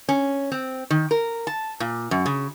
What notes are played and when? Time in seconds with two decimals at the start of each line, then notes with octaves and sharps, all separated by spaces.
0.09 C#4
0.52 C4
0.90 D#3
1.11 A#4
1.47 A5
1.80 A#2
2.11 F#2
2.26 C#3